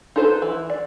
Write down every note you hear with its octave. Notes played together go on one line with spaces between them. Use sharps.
D#4 F4 A4 B4 C5
E3
D5